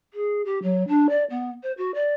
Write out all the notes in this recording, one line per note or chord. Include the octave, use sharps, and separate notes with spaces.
G#4
G4
F#3
D4
D5
B3
C5
F#4
D5